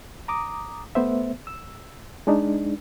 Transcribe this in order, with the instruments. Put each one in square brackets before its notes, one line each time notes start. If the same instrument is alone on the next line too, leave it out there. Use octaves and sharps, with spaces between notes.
[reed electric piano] A#5 D6 D#6
A3 B3 C5 E5
E6
G#3 D4 D#4